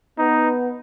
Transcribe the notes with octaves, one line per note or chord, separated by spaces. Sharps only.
B3 D#4